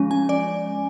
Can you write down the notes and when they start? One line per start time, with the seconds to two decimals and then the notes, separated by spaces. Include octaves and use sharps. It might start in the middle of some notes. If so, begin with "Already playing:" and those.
Already playing: F3 G#3 C#4
0.11 G#5
0.29 D5